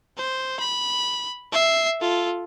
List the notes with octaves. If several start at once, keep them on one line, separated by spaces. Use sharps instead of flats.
C5
B5
E5 C7
F4 A4